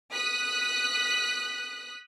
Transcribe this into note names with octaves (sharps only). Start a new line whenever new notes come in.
D#6 F#6 B6